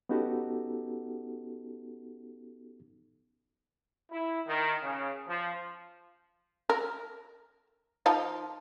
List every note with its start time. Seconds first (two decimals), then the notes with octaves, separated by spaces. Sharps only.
0.09 B3 C#4 D#4 F#4 G4 A4
4.11 E4
4.48 D#3
4.82 C#3
5.27 F3
6.70 A#4
8.06 F3 D#4 F4